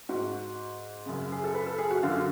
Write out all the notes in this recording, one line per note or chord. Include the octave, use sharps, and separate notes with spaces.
G#2 F#4
F#2 C#3
G#4
A4
B4
A4
G#4
F#4
F#2 D3 F4